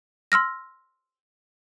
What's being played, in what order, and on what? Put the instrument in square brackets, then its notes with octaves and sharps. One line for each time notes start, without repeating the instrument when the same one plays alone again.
[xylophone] C6 E6 F6 A#6